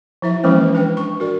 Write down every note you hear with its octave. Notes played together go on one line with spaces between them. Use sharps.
F3 E4 E5
E3 F3 G#3 A#3 C#4 C5
D4 B4 G5
C#6
F#4 A#4 D5